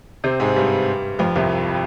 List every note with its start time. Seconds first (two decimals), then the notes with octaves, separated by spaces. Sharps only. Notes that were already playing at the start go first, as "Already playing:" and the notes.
0.24 C3 C4
0.40 G#2 G#3
0.56 G2 G3
1.19 F2 F3
1.36 C2 C3